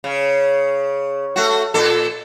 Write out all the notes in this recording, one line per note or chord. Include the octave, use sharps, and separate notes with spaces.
C#3
A3 F#4
A#2 A4